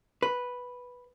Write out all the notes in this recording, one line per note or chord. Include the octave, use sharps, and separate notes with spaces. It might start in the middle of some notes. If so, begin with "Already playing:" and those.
B4